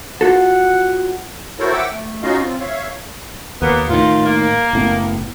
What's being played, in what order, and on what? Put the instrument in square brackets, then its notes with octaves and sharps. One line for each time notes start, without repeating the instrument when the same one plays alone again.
[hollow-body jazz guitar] F4 F#4 A4 [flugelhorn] F#5
[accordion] E4 F#4 A4 A#4 C5 C#5
E5 F#5 G5 D6 E6
A3
C#4 D#4 F4 F#4 D#5 F5
C4 F4
C#5 E5 F5
[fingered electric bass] D#2 [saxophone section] A#3 B3
[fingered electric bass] A2 D#3 [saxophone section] F4
[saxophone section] A#3
[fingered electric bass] F#1 A2 B3